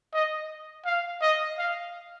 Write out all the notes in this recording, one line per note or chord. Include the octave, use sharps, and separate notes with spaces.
D#5
F5
D#5
F5